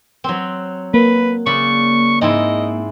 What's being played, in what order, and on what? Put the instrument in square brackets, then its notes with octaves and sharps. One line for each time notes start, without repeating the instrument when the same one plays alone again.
[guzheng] F#3 C4
[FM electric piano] A#3 [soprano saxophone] B4
[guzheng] C#3 D5 B5 [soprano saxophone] C#6
[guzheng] G#2 C4 E4 [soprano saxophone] D#5